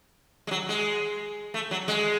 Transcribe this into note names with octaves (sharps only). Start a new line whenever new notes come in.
G#3
F#3
G#3
A3
F#3
G#3